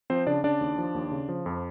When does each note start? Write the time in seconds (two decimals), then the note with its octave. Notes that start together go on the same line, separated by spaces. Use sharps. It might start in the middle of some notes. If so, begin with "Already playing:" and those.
0.10 F3 C4 C5
0.27 C#3 D4 D5
0.44 C#3 D4 D5
0.61 D#2
0.78 F3
0.95 D#2
1.11 C#3
1.29 F3
1.46 F2